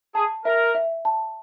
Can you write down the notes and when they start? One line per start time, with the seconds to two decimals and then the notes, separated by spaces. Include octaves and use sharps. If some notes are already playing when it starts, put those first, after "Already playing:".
0.15 G#4 A5
0.45 A#4 E5
0.75 E5
1.05 A5